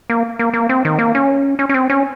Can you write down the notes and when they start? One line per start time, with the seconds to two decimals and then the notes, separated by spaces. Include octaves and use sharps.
0.10 A#3
0.39 A#3
0.54 A#3
0.69 C4
0.85 D#3
0.99 A#3
1.15 C#4
1.59 C#4
1.69 C#4
1.74 C4
1.90 C#4